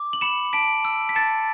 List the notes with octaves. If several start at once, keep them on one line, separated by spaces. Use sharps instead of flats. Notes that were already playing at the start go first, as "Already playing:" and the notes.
Already playing: D6
F#7
B5 C#7 E7
A5 B6 D7
E6
B6
A5 A6 C#7